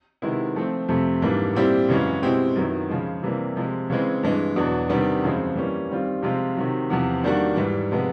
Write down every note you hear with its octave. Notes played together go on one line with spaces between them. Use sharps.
C3 D#3 G#3 B3 E4
F3 A3 C4
F2 C3 F3 A3 C4
G#2 E3 G3 A#3 D4
A#2 G3 C4 E4 G4
F#2 C#3 E3 G#3 C#4
B2 G#3 C4 E4 G4
F#2 D#3 F#3 B3 E4
C#3 F3 G#3
C3 E3 G3 A#3
C3 F3 G#3
C#3 E3 G#3 C4
G2 E3 G#3
E2 B2 F#3 B3 D4
C3 D#3 G3 B3 D4
F#2 C#3 F3 G#3 C4
E3 G3 A#3 C#4
D#3 G3 C4 F4
C3 F3 G#3 C4 F4
C3 D#3 F#3
E2 C3 F3
D#3 G3 A#3 D4 F#4
G#2 E3 G3
C3 F3 G#3 B3